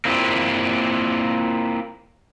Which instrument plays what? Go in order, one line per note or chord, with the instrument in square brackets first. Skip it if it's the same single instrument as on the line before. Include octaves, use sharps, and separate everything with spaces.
[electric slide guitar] A#3 C4 E4 F4 G4